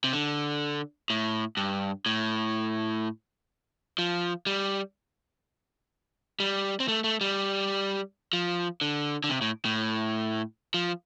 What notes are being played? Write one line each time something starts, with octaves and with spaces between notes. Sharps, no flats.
C3
D3
A2
G2
A2
F3
G3
G3
C4
A3
A3
G3
F3
D3
D3
C3
A2
A2
F3